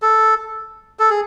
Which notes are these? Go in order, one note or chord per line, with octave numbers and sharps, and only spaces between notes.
A4
A4
G#4